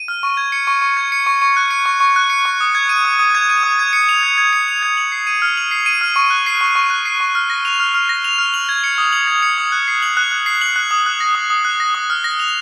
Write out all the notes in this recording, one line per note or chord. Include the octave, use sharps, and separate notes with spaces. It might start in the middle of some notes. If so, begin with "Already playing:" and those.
Already playing: D#7
F6
C#6
G#6
C#7
C#6
C#6
G#6
C#7
C#6
C#6
F#6
C#7
C#6
C#6
F#6
C#7
C#6
D#6
G#6
D#7
D#6
D#6
G#6
D#7
D#6
G#6
C#7
F7
G#6
G#6
C#7
F7
G#6
F#7
C7
D#7
F6
F#7
C7
D#7
F6
C#6
F#6
C7
C#6
C#6
F#6
C7
C#6
F6
A#6
F7
F6
F6
A#6
F7
F6
F#7
G#6
C#7
D#6
F#7
G#6
C#7
D#6
F#6
C7
F#7
F#6
F#6
C7
F#7
F#6
D#6
F#6
A#6
D#6
D#6
F#6
A#6
D#6
F6
A#6
F7